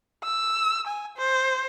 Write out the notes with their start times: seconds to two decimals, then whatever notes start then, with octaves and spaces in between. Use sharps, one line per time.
0.24 E6
0.87 G#5
1.17 C5